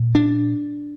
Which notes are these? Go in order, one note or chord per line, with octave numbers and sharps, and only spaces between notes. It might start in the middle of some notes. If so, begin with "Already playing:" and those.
Already playing: A#2
D4